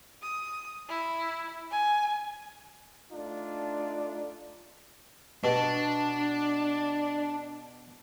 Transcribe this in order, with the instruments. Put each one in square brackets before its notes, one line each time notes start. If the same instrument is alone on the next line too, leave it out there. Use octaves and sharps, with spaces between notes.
[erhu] D#6
E4
G#5
[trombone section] A3 D4 D#4 F4
[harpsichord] B2 [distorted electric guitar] D4